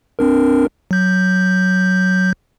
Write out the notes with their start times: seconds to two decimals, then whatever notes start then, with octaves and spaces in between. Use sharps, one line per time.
0.19 C4 D4 A#4
0.91 F#3 G6